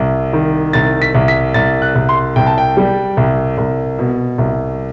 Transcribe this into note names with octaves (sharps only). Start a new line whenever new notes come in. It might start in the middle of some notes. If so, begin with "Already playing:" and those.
Already playing: C2
D#3
C2 A6
B6
C2
B6
C2 A6
F#6
C2
C6
C2 G5
A5
G5
G3
C2
C2
B2
C2